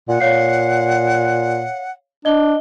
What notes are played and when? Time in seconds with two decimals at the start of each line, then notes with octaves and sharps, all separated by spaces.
0.09 A#2 F#5
0.20 A#2 C#5 F5 C7
2.25 D4 D#5 G7